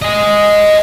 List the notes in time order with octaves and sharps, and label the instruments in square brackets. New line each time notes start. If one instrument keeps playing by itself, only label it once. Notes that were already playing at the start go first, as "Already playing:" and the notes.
[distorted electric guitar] D#5 G#5